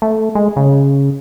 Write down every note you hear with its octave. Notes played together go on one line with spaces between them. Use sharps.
A3
G#3
C#3